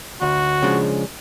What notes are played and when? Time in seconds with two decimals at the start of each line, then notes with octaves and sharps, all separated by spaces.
0.21 D2 F#4
0.62 C#3 F3 G#3 D4